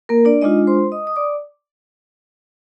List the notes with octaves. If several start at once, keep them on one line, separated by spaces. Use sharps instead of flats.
A#3 A#4
D4 D5
G#3 D4 D#4 F4 D#5
C5 C6
D#5 D#6
D#6
D5 D6